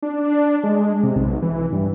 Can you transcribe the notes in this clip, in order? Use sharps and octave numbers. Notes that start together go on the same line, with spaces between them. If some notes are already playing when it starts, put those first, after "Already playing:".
D4
G#3
C3
B1
E3
G2